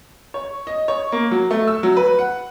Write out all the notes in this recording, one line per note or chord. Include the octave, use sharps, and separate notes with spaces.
C#5
D#5
C#5
A#3
F#3
A3
E6
F#3
B4
F#5